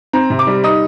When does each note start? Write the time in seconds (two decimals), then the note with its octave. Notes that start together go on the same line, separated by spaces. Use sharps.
0.13 C4 A#5
0.30 C3
0.39 D6
0.47 G3
0.64 D#4 D#6